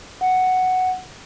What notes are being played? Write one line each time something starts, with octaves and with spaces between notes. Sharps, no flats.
F#5